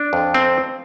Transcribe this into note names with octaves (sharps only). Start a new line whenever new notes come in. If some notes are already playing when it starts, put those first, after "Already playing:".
Already playing: D4
F2
C4